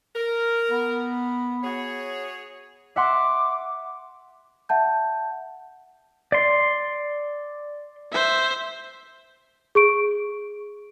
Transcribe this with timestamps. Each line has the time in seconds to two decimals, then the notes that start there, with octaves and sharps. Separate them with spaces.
0.15 A#4
0.70 B3
1.63 F#4 G#4 C#5
2.96 E5 F#5 C6 D6
4.69 E5 F#5 A5 G6
6.32 D5 C6
8.12 C5 E5
9.75 G#4 C#6 D7